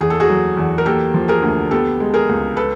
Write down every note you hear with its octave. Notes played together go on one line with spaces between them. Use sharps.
E2 G#4
A4
F#4 G#4
F#3
E2
A#4
A#3 G4 A4
F3
G#4 A#4
D2
B3 G4 A4
G#3
G#4 A#4
C#2
A4 B4